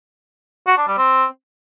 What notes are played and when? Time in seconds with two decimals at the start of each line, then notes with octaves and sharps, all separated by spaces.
0.67 F#4
0.77 D4
0.88 G3
0.98 C4